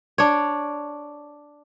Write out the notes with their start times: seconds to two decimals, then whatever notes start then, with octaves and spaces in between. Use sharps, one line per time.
0.18 D4 C#5